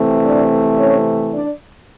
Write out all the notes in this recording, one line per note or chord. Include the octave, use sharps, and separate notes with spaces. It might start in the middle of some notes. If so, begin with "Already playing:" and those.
Already playing: C3 E3 A3 C4
D4 D5
C#4 C#5
D4 D5